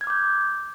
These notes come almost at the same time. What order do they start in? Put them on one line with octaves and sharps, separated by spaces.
G#6 F6 D6 G6